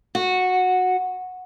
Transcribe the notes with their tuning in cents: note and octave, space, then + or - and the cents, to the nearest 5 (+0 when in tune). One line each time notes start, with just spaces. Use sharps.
F#4 -10